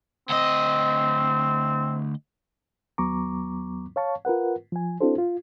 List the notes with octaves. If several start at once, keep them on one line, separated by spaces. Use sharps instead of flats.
D2 C4 D#5
D#2 F#3 B3 A#5 C#6 D6
C#5 F5 A5 C#6
F4 A#4 B4 F#5
F3 G#5
C4 D4 E4 F#4 A4 C5
F4